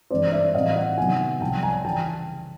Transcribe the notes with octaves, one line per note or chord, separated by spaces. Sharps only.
G2 E3 G#3 C4 C5 D5
D5 E5
A2 E3 G3 C4 D#5 F5
E5 F#5
C3 D#3 F#3 B3 F#5 G#5
C2 C3 F3 G5 A5
G#5 A#5
C#3 E3 G5 A5